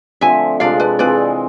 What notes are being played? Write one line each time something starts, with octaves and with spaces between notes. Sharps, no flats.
D3 F3 A3 C4 E5 G#5
C3 F3 G#3 D4 D5 F5
B4 D5
E3 G#3 C4 F4 B4 D5